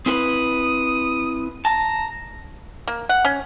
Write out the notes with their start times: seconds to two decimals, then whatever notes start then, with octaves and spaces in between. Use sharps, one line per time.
0.06 C4 E4 B4 D#6
1.65 A5 A#5
2.87 A#3
3.09 F#5
3.25 C#4